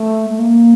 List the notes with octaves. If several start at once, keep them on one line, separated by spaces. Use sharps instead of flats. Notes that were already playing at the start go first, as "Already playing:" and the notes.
Already playing: A3
A3
A#3